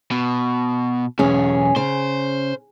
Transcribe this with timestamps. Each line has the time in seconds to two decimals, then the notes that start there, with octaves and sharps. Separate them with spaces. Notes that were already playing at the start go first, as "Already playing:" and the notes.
0.11 B2
1.19 B1 E2 C#4 G#4
1.76 C#3 C5